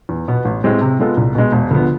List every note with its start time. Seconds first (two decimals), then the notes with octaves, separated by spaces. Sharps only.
0.09 E2
0.28 B2 B3
0.45 A1
0.64 A2 G#3 C4 G#4
0.81 C3
1.00 G#3 B3 F4 A4
1.17 C2
1.35 B2 G#3
1.52 E1
1.71 D2 D3 F3 B3